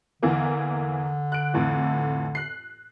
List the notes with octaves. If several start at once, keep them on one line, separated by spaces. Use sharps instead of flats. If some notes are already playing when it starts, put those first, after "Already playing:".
E2 D3 E3 A#3
F#6 D7
F2 A2 E3
F#6 C7